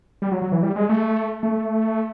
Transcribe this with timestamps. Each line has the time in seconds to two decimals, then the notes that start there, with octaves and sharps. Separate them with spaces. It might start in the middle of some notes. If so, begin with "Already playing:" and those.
0.22 G3
0.32 F#3
0.42 F#3
0.52 E3
0.63 G3
0.76 G#3
0.89 A3
1.43 A3